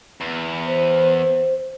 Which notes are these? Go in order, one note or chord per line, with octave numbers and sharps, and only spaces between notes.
E2
C5